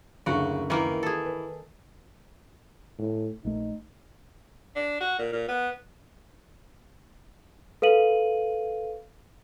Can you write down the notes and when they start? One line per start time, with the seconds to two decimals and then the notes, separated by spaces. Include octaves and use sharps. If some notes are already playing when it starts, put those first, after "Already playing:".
0.26 F#1 D2 C#3 F#4 C#6
0.70 D#3 E3 A#3
1.03 G#4 A4
1.26 B4
2.99 A2
3.45 A#1 A3 D#4
4.76 D4
5.01 F#4
5.19 A#2
5.32 A#2
5.48 B3
7.82 A4 B4 F5 D#7 F#7